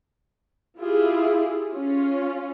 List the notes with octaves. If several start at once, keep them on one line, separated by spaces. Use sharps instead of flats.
E4 F4 G4 G#4
C#4 F4